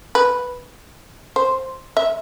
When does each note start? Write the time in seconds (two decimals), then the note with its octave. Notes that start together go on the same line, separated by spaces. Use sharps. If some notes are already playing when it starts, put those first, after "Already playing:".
0.15 B4
1.36 C5
1.97 E5